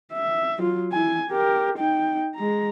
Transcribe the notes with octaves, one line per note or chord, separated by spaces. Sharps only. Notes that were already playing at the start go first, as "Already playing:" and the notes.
E5
F#3 F4
E4 G#5
G4 A#4
D#4 G5
G#3 A#5